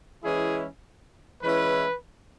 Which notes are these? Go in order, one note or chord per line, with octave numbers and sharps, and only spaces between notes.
E3 G#3 C#4 E4 G#4
E3 G#3 C#4 E4 B4